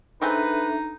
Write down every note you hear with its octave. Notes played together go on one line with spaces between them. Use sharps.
E3 G#3 C4 D4 D#4 A4 B4 E5